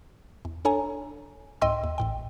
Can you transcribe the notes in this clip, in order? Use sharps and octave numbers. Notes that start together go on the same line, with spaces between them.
E2
D4 A4 C#5 G#5 A#5
C2 G#2 D#5 G5 C6 E6
D#2
A1 A2 G5